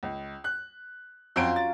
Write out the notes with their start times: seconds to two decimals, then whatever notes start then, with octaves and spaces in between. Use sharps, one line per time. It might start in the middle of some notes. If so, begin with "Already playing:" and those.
0.03 C#2
0.44 F#6
1.36 F2 F#3 C4 C#4 F4 D7
1.56 A6